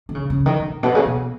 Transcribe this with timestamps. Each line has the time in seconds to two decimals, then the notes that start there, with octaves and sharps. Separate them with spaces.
0.09 D#3
0.15 C#3
0.30 C#3
0.46 D#3
0.60 D#3
0.71 G#2
0.83 B2
0.95 C#3
1.06 B2